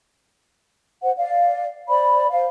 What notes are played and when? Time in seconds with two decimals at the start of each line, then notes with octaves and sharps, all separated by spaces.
1.02 C5 F#5
1.16 D5 F5
1.88 C5 D5 B5
2.30 C5 F5